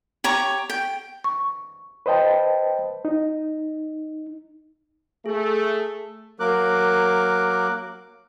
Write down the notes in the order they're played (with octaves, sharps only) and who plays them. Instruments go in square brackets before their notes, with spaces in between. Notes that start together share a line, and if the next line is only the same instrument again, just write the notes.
[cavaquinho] G4 C#5 A#5 C#6
G5
[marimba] C#6
[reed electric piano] B4 C5 D#5 G5 A5
D#4
[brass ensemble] A3 [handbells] G#4
[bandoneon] F#3 A#3 A#4 D6 F#6